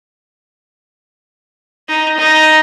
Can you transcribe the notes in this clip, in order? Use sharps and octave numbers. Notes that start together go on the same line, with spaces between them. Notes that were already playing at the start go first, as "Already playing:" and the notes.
D#4
D#4